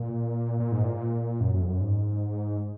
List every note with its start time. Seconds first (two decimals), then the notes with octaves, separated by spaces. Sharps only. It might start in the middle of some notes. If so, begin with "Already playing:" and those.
Already playing: A#2
0.60 A#2
0.72 G#2
0.84 A#2
1.41 F#2
1.54 F#2
1.61 F2
1.68 F#2
1.81 G#2